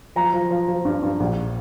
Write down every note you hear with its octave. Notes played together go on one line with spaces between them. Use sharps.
F3 A#5
F3
F3
F3
G2
G2
A#1